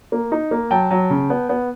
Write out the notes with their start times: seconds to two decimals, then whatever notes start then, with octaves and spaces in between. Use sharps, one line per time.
0.12 A#3
0.32 D#4
0.51 A#3
0.71 F#3 G5 A5
0.91 F#3
1.10 C#3
1.30 B3
1.49 B3